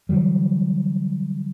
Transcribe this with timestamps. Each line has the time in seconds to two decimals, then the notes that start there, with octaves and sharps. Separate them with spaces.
0.09 D3 E3 F#3 G3